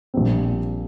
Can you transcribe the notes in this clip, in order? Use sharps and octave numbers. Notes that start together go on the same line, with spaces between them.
A#1 A#2 G3 C4